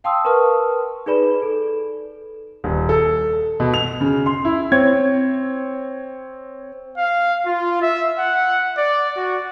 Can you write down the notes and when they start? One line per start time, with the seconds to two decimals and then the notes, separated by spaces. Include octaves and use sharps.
0.04 F5 G5 A5 C6 D#6 E6
0.25 A#4 B4 A5 C#6 D#6 F6
1.06 D#4 G#4 B4 D5 B5 E7
1.42 A4
2.64 D#1
2.89 A4
3.60 B2
3.74 F7
4.01 C#3
4.26 C6
4.45 E4
4.72 C4 C#5 G#6
6.98 F5
7.46 F4
7.82 E5
8.19 F#5
8.78 D5
9.17 F#4